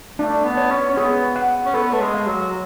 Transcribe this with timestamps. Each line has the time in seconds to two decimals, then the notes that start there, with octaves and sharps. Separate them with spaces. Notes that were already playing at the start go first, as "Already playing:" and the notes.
0.19 A3 D4
0.44 B3
0.57 C#5
0.71 C#4
0.89 C#4
0.97 B3 G#4
1.36 F#5
1.66 C#4
1.74 B3 A4
1.93 A3
2.01 G#3
2.14 F5
2.26 F#3